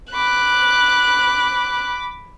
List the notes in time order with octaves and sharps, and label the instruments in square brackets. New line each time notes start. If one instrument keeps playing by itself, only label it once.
[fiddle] B5 D6 [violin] F#6